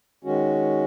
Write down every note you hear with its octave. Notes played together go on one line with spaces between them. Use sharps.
D#3 G#3 C#4 F#4